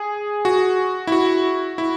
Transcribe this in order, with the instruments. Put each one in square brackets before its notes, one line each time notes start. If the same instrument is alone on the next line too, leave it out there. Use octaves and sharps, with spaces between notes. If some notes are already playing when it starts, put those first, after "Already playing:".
Already playing: [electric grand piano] G#4
F#4
E4
F#4
E4